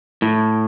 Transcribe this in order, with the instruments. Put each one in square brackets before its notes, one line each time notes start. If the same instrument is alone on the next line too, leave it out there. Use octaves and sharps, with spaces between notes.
[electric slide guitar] A2